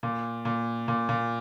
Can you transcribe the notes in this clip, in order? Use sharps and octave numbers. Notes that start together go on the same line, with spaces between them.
A#2
A#2
A#2
A#2